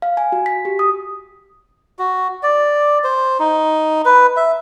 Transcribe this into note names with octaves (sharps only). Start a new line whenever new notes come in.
F5
G#5
F#4
B6
G4
D#6
F#4
D5
C5
D#4
B4
E5